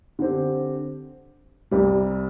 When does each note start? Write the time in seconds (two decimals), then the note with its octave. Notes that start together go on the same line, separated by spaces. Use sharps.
0.19 D3 C4 G4
1.71 C2 C3 G3